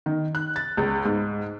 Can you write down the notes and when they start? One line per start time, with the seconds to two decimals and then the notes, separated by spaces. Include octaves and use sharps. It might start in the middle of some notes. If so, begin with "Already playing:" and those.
0.06 D#3
0.35 F#6
0.56 A6
0.77 C#2
1.05 G#2